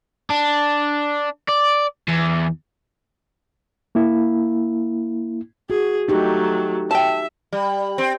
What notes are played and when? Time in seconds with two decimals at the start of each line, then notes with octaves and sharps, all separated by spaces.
0.30 D4
1.48 D5
2.08 E2
3.95 A#3 E4
5.70 F#4 G#4
6.08 F#3 A3 D#4 G4
6.91 E5 G5 A5
7.53 G3
7.98 C4